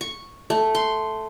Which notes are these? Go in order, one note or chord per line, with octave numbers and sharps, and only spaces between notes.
C#6
A3
C6